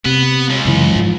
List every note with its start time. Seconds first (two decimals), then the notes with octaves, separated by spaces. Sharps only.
0.06 C3 B3
0.51 C#2
0.65 F#2 C#3 E3
0.91 G#2 F3